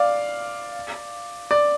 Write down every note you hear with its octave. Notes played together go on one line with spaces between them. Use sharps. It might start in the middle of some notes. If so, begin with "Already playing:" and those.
Already playing: D5 F5
D5